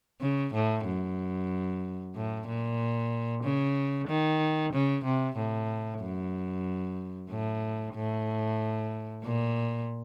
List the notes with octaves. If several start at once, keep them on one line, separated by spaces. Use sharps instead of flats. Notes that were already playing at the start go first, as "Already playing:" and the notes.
C#3
A2
F#2
A2
A#2
C#3
D#3
C#3
C3
A2
F#2
A2
A2
A#2